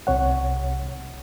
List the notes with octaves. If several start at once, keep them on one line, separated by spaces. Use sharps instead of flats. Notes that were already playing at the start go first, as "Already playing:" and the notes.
C2 C3 C#5 F#5